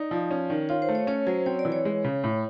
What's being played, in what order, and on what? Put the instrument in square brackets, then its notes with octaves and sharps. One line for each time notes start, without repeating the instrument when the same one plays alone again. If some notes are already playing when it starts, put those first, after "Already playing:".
Already playing: [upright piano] D#4 [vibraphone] D5
[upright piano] F3
C#4
D#3
[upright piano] F4 [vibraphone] C#5
[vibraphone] C5
[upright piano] A3
[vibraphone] C#5
[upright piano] C#4 [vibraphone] C#5
[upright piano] F#3 [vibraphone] C5
[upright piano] C4 [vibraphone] C#5
[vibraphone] D5
[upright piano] E3
[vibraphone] C#5
[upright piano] G#3
C#3
A2